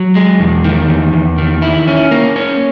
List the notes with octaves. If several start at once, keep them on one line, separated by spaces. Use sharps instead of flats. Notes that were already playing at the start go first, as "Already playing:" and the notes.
Already playing: F#3
G#3
E2
D#3
E2
E2
D#3
E4
C#4
A#3
C#4